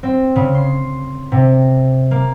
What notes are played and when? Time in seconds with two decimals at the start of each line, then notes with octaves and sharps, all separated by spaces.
0.03 C4
0.36 C#3
0.55 C6
1.32 C3
2.11 A#3